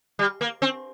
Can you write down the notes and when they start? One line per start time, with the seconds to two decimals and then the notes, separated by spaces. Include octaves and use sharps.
0.19 G3
0.41 A#3
0.62 C4